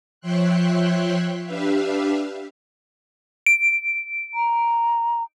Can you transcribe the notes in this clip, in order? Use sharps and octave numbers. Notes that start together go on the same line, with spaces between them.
F3 C#5 E5 G5 C6 F#6
D4 G4 B4 E5 F5
D7
A#5